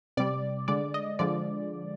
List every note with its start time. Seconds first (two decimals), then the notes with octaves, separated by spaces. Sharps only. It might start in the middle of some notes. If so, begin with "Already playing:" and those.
0.17 C3 G3 D5
0.68 D3 G#3 D5
0.94 D#5
1.19 D3 F3 G#3 D5